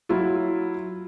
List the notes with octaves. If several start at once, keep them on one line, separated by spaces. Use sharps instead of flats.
F#3 E4 F4